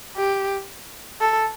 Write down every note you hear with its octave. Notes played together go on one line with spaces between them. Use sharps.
G4
A4